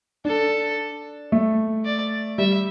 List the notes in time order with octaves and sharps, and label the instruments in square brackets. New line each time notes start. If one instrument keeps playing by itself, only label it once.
[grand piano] D4 [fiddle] A4
[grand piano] A3
[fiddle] D5
[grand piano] G3 [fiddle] E5